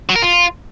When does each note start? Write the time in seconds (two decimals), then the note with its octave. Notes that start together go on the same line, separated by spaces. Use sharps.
0.09 F#3
0.16 A#4
0.22 F4